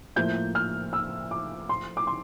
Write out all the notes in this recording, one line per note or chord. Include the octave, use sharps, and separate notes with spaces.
A2 F3 A#3 G6
F6
E6
D6
C6
D6
C6